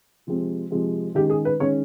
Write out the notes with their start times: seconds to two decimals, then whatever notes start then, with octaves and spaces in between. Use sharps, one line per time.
0.27 C3 F3 G#3 C4
0.70 C3 F3 G#3 C4
1.15 D#3 G#3 C#4 G4
1.30 G#4
1.45 B4
1.60 D#3 G#3 C#4 C#5